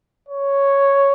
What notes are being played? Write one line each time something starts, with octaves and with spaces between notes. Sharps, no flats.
C#5